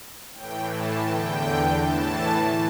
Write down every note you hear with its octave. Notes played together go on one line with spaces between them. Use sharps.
A2 E3 G5
A5
E2 D3 G5
A2 E3 A5